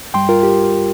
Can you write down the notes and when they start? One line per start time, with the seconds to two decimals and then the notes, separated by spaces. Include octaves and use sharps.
0.14 G2 G3 G5 C6
0.29 F4 A#4
0.43 G4